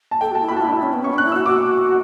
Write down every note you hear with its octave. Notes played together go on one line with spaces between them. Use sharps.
A5
A4 G5
F#4 A5
E4
B5
F#4
A5
E4
D4 B5
E4
C#4
B3
C#4 C#6
D4 F#6
E4
F#4 E6
F#4 D6